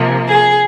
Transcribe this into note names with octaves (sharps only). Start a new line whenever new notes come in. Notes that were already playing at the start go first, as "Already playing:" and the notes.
Already playing: C3 F3 A#3
G#4